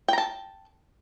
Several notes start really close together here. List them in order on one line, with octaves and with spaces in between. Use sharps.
G5 A#5 A5